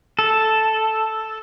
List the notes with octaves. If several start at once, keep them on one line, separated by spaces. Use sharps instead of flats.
A4